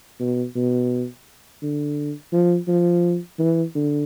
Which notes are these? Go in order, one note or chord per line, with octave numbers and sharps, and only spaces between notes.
B2
B2
D3
F3
F3
E3
D3